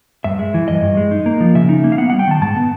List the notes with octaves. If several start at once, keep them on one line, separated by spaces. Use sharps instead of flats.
G2 E5
G#3
E3
G2 D#5
G2
G#3
D#4
A#3
F3
C#3 E5
D#4
A#3
F5
B3 F#5
G3 F#5
G5
D#3 A5
G#2 A5
B3